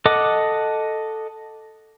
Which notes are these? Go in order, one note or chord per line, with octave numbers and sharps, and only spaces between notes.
A4 D#5 F#5 D6